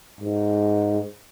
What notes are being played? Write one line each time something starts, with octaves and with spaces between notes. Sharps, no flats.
G#2